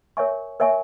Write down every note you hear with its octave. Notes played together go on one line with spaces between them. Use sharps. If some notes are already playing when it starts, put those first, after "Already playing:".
A#4 C#5 E5 G#5 C#6
A#4 C#5 E5 G#5 C#6